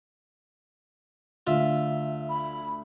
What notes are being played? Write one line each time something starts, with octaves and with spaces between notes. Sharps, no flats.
D2 F4 E5
B5